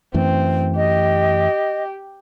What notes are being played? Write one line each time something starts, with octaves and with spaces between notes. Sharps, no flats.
F#2 E3 A3 C4
G4 D#5